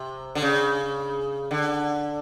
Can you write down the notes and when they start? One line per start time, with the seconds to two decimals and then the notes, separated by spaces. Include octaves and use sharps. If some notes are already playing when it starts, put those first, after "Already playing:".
Already playing: C3
0.35 D3
0.42 C#3
1.51 D3